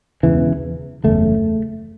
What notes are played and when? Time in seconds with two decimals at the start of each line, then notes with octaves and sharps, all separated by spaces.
0.23 E1 E2 C#3 E3
1.04 F#1 E2 C#3 A3